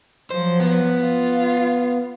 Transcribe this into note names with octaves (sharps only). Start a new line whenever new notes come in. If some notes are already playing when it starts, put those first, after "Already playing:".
F3 F#3 C5
B3
F4